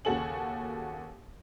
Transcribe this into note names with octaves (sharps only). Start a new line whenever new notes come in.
D#2 C#3 F#4 A4 G#5 F#7